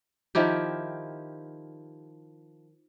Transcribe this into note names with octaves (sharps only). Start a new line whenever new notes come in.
D#3 F3 E4 G4